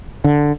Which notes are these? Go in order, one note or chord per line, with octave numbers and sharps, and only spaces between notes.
D3